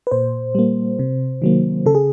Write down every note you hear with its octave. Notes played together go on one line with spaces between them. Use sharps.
B4
A#2 C5
G3 A#3
C3
D#3 F#3 A#3
C#3 A4
G#4